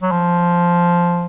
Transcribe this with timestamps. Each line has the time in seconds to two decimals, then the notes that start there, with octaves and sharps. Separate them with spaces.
0.02 F#3
0.11 F3